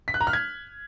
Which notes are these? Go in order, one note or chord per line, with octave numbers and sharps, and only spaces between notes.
B6
F#6
A#5
F6
G#6